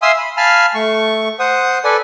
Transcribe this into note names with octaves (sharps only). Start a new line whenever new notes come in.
E5 F5 G#5 C6 D#6 E6
B5
F5 G#5 A5 B5 F6
A3 C#6
C5 F#5 D#6
A4 B4 D5 G#5